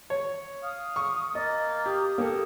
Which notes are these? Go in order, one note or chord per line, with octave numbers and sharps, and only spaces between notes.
C#5
F5 D#6
C#6
A#3 D#5 A6
G4 D#6
A#3 G4 A4